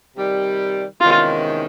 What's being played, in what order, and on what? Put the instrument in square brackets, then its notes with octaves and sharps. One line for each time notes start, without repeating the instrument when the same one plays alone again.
[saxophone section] C3 D#3 G3
[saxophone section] E2 C3 D#3 G#3 C#4 [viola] F4